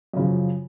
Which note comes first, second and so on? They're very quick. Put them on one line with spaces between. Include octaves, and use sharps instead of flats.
F#2 C#3 F3